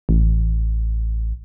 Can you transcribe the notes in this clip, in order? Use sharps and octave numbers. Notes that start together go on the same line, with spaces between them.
A1